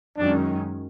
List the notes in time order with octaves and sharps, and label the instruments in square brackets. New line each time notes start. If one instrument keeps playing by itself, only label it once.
[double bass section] F#2 D#3 G#3 C#4 [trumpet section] D4